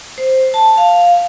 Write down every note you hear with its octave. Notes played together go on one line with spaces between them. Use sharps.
C5
A5
F5